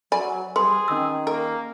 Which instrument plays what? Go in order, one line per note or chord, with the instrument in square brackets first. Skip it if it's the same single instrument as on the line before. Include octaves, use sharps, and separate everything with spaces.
[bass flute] F#3 [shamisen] D5 G#5 B5
[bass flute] G3 [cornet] G#4 [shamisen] B4 [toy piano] C6
[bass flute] D#3 [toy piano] C#4 E6
[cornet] A#3 [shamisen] A#4